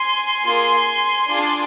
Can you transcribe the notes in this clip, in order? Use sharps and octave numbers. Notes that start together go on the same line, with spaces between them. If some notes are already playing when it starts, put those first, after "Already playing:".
Already playing: G#5 C6
A#3 F4 G#4
D4 F4 G#4